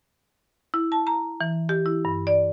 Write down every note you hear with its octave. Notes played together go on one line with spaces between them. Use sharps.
E4
A5
A#5
E3
G4
E4
G2
D5